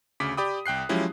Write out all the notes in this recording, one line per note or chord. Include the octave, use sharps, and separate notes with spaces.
D2 C#3 D6 B6
G4 D5 G5 B5 D6 D#6
C2 G5 F#6 C7
F3 F#3 G#3 C#4 E4 G4